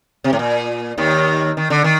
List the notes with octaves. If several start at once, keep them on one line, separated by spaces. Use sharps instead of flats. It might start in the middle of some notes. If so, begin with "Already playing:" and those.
C3
A2
A#2
D#2 D#3
D#3
D3
D#3